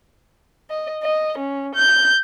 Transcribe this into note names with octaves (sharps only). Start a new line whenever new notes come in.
D#5
D#5
C#4
G6